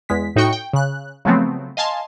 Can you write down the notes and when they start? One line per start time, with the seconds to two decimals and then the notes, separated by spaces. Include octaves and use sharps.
0.09 E2 G#3 B6
0.36 A2 D#4 F#4 G5 C#6 C#7
0.53 G5
0.73 C#3 F#6
1.25 C#3 F3 F#3 A3 B3 C4
1.77 D#5 F5 G#5 A5 C6